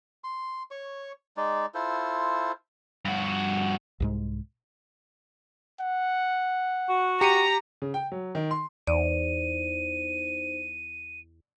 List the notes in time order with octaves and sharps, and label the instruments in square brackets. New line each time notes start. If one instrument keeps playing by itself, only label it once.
[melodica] C6
C#5 C#6
G#3 D#4 D5
E4 F4 A4 C5
[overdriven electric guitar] G2 F#4
[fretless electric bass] C2 G#2 G#3
[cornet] F#5
[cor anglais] F#4
[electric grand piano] G4 C#7 D#7 [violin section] A#5
[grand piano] C#3
G5
F#3
D#3
C6
[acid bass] E2 [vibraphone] D#4 C5 [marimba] D5 [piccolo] D#7